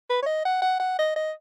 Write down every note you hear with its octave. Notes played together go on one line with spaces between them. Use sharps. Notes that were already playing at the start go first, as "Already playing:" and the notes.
B4
C#5
D#5
F#5
F#5
F#5
D#5
D#5